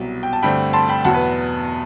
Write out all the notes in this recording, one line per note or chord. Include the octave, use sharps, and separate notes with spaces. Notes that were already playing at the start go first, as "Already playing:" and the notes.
Already playing: C2 B2 F#3
G5
A5
G2 D3 A3 C4 G5 B5
A5 C6
G5 B5
E2 B2 F#3 B3 F#5 A5
B4